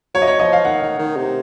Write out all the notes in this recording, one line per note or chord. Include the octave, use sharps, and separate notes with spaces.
F#3 C#5
D#5
C#5
F3 D#5
F5
D#3 F#5
D#3
D#3
C3